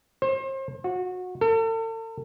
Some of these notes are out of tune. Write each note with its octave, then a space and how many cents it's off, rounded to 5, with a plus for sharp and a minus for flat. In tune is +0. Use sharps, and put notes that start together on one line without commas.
C5 +35
F#4 -25
A4 +40